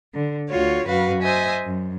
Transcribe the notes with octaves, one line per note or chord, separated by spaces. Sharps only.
D3
D2 F4 F#4 C#5
F#2 F#4 B4 F5
C5 D#5 E5 G#5
F#2